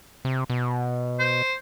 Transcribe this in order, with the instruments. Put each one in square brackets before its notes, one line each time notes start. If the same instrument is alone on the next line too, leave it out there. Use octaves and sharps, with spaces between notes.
[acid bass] C3
B2
[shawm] C5